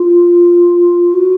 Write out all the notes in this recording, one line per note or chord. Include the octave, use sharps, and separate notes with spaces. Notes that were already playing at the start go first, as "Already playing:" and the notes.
Already playing: F4
F#4